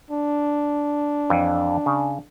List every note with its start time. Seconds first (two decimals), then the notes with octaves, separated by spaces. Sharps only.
0.10 D4
1.30 F2 E3
1.86 C#3